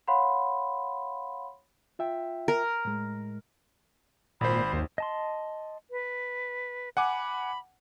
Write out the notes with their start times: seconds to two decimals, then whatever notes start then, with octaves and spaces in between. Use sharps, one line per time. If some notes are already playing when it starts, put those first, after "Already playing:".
0.08 C#5 F5 F#5 B5 C6
1.99 F4 E5 G5
2.48 A#4
2.85 A2 G#3
4.41 G#1 A#2 C5 B5
4.72 D#2
4.98 D#5 A5 C6
5.91 B4
6.97 F#5 G#5 B5 D6